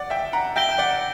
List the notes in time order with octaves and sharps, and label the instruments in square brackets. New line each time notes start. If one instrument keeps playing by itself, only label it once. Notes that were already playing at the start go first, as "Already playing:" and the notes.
Already playing: [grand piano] D5 F#5
E5 G5
F#5 A#5
[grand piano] E5 G5 [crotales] G6 A#6 D7 G7
[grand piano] G5
D5 F#5